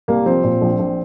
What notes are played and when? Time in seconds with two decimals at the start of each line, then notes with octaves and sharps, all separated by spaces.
0.08 C2 A#3
0.26 F3 C4
0.44 A#2
0.61 A#1
0.79 A#1